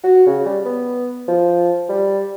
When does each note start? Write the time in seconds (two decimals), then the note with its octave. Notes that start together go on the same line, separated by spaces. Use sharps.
0.04 F#4
0.27 C#3
0.46 G3
0.65 B3
1.28 F3
1.89 G3